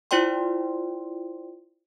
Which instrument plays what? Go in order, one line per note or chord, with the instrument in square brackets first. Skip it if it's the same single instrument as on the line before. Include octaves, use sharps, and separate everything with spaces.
[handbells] E4 F4 C5 D5 G5 C6